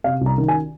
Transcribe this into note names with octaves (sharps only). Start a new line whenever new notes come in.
C3 F5
C2
A#5
D#3
G#5